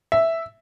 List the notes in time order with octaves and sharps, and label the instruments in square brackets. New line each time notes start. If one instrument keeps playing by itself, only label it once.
[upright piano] E5